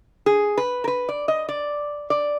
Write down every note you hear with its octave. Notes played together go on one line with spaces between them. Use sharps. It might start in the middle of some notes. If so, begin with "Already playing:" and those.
G#4
B4
A#4
B4
D5
D#5
D5
D5